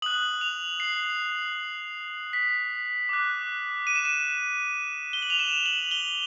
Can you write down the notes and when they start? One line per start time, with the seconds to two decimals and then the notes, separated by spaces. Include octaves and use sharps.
0.02 D#6 F#6 F#7
0.41 F7
0.80 C7
2.33 B6
3.09 D6 F#6
3.87 D#7
3.96 E7
4.05 D#7
5.13 G7
5.22 F#7
5.30 F7
5.39 E7
5.66 F#7
5.91 G7